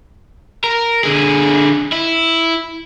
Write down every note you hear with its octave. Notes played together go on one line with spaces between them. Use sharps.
A#4
D3 G#4
E4